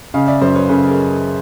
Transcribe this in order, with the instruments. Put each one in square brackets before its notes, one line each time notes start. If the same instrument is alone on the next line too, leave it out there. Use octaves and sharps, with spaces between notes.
[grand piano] C#3 [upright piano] D#5 F5
[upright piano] D5 E5
[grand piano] F#2 [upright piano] C5 D5
[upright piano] B4 C#5
[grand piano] C#3 [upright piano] A4 B4
[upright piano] G#4 A#4